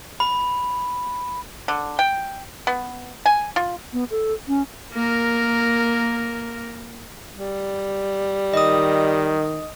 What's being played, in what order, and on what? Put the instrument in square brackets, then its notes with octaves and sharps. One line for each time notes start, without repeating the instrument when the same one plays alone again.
[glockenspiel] B5
[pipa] D3
G5
B3
G#5
F4
[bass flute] B3
A4
C#4
[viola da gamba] A#3 A#4
[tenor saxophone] G3
[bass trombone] D#3 [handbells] D#5 D#6